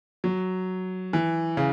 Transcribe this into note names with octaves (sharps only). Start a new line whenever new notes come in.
F#3
E3
C#3